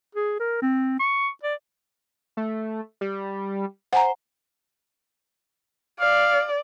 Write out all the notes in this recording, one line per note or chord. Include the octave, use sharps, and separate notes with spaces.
G#4
A#4
C4
C#6
D5
A3
G3
C5 F#5 G#5 A#5
D5 F5